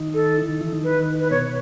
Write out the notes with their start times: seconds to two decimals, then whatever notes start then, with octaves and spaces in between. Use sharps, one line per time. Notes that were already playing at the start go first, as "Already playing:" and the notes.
Already playing: D#3 D#4
0.14 A4
0.38 E4
0.49 D#3 D#4
0.61 E3 E4
0.72 D#3 D#4
0.84 B4
1.20 B4
1.30 B2 B3 C#5